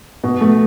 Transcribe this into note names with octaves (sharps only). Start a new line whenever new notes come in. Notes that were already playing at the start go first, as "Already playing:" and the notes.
B2
A3